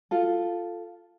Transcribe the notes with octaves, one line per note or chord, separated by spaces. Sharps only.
F4 A4